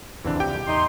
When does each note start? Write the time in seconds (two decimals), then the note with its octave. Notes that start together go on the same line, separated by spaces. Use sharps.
0.24 D#1 G#1 C#3 E3 C4 D4
0.40 C#2 F3 G4 G5
0.54 C#2 B2 G3
0.67 E2 A2 D#4 C6